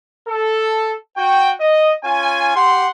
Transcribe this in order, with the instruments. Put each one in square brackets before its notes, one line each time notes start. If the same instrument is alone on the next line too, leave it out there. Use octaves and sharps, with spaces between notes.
[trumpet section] A4
F#4 G5
D#5
C#4 F4 G#5
G4 F#5 C6